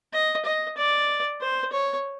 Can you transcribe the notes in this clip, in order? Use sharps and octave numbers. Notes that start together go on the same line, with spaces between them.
D#5
D#5
D5
C5
C#5